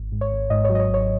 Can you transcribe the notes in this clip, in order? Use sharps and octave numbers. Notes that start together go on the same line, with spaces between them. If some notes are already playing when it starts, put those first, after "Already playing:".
Already playing: G#1
G#2
C#5
G#1
G#2 D#5
C#5
F#3
D#5
C#5
G#1 C#5